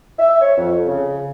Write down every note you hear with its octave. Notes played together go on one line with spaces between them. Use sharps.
E5
C#5
F2
C#3